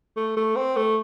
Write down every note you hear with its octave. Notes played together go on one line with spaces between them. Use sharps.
A3
A3
C4
A3